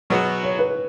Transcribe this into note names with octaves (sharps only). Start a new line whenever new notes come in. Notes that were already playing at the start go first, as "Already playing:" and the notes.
B2 F#3 B3 F#4 G#4
C#5
B4